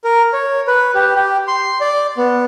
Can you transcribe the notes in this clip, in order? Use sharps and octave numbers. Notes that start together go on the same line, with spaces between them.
A#4
C#5
B4
G4
G4
C6
D5
B3